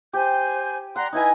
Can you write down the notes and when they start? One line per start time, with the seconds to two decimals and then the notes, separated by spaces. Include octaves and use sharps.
0.13 G4 C5 G#5 G6
0.96 D5 F#5 A#5 C6
1.13 D#4 E4 B4 D#5 G#5 G#6